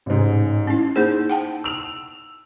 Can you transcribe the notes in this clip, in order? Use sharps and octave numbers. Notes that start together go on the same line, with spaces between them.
A1 G#2
C#4 E4
A#3 D#4 G#4 C5
F#5 G5 A5
E6 F7